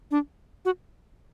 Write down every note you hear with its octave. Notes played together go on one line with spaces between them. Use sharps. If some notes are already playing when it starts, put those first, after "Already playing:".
D4
F#4